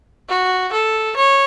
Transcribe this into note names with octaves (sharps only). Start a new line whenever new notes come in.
F#4
A4
C#5